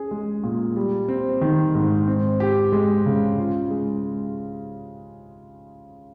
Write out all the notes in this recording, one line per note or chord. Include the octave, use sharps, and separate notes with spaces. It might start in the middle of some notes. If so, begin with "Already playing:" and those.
Already playing: C#4 G#4
G#3
A#2
G3
C4
D#3
G#2
C4
G4
G#3
C#3
F4
G#3